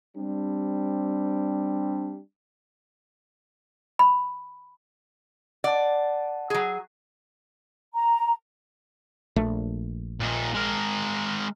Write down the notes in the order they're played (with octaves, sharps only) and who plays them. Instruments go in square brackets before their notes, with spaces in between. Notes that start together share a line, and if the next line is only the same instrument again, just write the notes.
[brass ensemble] G3 C4 D4
[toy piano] B5
[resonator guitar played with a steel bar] D5 [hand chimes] F#5 A5
[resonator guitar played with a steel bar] F#3 G#4
[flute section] A#5
[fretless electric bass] A#1 A3
[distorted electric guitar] A#2 D#4
G#3 A#4